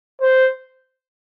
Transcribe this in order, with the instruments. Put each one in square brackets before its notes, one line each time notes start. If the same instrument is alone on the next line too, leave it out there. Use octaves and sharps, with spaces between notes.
[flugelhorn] C5